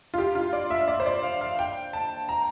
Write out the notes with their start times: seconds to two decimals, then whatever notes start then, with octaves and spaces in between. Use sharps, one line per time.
0.14 F4
0.18 G4
0.35 F4
0.53 D5
0.70 E5
0.88 D5
1.00 C5
1.06 D5
1.23 F5
1.41 F5
1.59 G5
1.93 A5
2.29 A#5